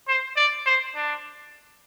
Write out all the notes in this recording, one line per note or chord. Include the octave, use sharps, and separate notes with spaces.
C5
D5
C5
D4